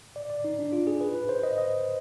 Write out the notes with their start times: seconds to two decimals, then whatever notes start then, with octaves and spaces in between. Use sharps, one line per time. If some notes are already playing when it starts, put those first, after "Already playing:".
0.16 D5
0.30 D5
0.44 D#4
0.59 D4
0.72 F4
0.87 G#4
1.01 B4
1.15 B4
1.29 C5
1.43 D#5
1.58 D#5